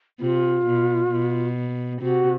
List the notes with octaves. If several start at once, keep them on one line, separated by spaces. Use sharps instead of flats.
C3 F4
B2
B2
C3 F#4